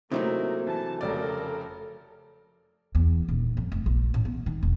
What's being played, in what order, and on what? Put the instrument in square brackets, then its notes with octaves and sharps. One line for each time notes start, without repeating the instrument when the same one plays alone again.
[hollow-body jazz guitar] C3 F#3 A3 [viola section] A#3 [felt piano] D#4 E4
[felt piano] E3 [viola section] A5
[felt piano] F1 C#3 D5 [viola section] A4 A#4
[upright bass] E2
D#1
F2
F1
A#1
A1
B3
D#3
E1